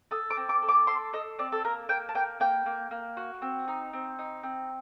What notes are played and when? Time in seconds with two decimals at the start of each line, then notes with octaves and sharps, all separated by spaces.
0.11 A4 D#6
0.30 D6
0.37 C4
0.49 D6
0.62 A4
0.69 D6
0.87 A4 C6
1.13 A4 D#5
1.39 C4 D5
1.52 A4
1.64 A#3 A#4
1.89 A#3 G5
2.09 A5
2.15 A#3 G5
2.40 A#3 G5
2.66 A#3
2.91 A#3
3.17 F#4
3.42 C4
3.68 D#4
3.93 C4
4.19 D#4
4.43 C4